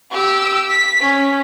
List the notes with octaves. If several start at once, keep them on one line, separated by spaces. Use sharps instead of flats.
G4 E6
B6
C#4